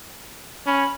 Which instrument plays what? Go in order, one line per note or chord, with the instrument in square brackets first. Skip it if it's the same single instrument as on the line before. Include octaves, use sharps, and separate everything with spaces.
[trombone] C#4 [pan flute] B5